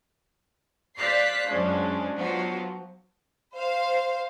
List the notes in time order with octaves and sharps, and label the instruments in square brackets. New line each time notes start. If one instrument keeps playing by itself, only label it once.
[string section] C5 D5 F5 F#6 B6 C7
F#2 F3 G#3 C#4 D4
F3 F#3 B3 F4 F#4
[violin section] C5 F5